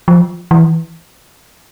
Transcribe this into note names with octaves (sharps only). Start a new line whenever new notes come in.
F3
E3